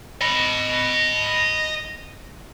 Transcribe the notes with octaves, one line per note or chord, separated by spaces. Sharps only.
D#5 B5